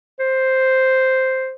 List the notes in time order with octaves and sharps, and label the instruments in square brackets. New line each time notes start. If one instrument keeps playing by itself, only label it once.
[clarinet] C5